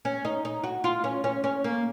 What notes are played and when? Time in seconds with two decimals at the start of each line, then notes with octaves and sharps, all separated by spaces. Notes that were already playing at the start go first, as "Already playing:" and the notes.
0.05 C#4
0.25 D#4
0.45 D#4
0.64 F#4
0.84 F4
1.04 C#4
1.24 C#4
1.44 C#4
1.64 A#3